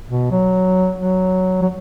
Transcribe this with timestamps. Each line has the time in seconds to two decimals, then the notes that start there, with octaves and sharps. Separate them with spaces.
0.08 B2
0.31 F#3
0.99 F#3
1.62 F#3